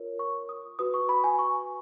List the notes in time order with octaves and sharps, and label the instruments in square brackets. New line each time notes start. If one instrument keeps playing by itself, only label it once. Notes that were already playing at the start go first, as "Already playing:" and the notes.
Already playing: [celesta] F4 A#4 C#5
C#6
D#6
F#4 B4 D#6
C#6
B5
G#5
C#6